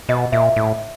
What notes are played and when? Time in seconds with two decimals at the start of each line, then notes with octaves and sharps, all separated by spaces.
0.09 B2 D#5
0.32 A#2 E5
0.56 A2